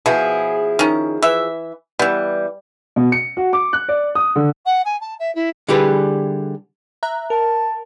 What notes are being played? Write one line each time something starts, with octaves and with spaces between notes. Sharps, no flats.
B2 F3 E4 G#4
D#3 C#4
E3 E5
E3 G3 B3
B2
C#7
F#4
D6
F#6
D5
D#6
D3
F#5
G#5
A5
E5
E4
D3 G3 E4 G4 G#4 B4
E5 A#5 F#6
A#4 A5